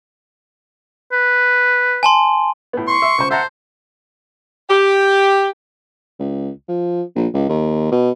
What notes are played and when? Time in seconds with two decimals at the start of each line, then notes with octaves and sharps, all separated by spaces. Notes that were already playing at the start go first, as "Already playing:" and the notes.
1.12 B4
2.03 G#5 A5 C6
2.73 A2 B3
2.87 C6 C#6
3.02 E5
3.18 C#2 C5
3.31 C5 E5 F#5 A5 A#5
4.69 G4
6.19 C#2
6.68 F3
7.15 A#1
7.34 C#2
7.49 D#2
7.92 B2